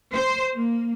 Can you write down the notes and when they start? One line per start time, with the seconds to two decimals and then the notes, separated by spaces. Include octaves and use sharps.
0.13 C5
0.55 A#3